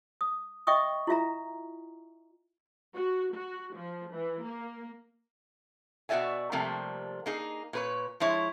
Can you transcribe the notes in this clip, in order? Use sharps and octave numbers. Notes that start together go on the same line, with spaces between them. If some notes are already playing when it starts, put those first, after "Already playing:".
D#6
D#5 E5 G5 C#6 D#6
E4 F4 E5 A#5
F#4
F#4
F3
E3
A#3
B2 F#4 G4 D5 E5 G#5
C3 F3 G3 A3 A#3
A#3 D#4 G#4
A#2 B4 C#5
F3 G#3 E4 C#5